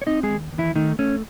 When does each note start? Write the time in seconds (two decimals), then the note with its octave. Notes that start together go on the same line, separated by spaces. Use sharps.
0.02 C#5
0.06 C4 D#4 D#5
0.23 G#3 G#4
0.30 D#2
0.53 D#2
0.58 E3 E4
0.75 D#3 A3 D#4
0.99 A3 C#4